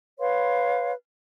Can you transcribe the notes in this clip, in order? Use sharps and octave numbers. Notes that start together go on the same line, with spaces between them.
B4 C#5 F5 C6